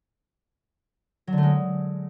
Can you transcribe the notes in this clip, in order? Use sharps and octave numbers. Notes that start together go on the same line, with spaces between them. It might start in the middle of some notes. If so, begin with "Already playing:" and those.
F#3
D3
A3
G#3